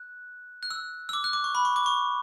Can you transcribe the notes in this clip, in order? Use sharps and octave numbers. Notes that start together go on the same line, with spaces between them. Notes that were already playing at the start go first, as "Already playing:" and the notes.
Already playing: F#6
F#6
E6
E6
D6
F#6
D6
C#6
B5
C#6
D6
C#6